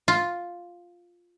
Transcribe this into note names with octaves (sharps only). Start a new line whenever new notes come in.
F4